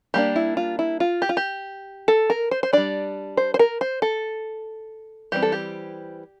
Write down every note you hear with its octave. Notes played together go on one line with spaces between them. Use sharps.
G3 A#3 D4 G4
E4
F4
E4
F4
G4
F4
G4
A4
A#4
C5
C5
G3 D4 D5
C5
C5
A#4
C5
A4
E3 G3 C4 G4
A4
G4